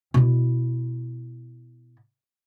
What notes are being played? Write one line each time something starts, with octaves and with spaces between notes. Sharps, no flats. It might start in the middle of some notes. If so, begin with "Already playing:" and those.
B2 E4